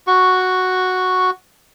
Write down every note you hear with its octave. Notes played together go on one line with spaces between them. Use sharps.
F#4 C#6